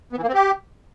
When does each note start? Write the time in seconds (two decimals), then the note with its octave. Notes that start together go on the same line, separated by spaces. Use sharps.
0.13 B3
0.18 E3
0.23 A#3
0.29 C4
0.34 G4